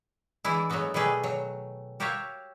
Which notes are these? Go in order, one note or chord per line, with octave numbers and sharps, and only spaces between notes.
E3 G#3 D4 E4
F#3 G#3 A3 B3 F#4
B2 D#3 G3 A3 G#4 B4
F#3
F#4 G4 A#4 C#5 E5 F5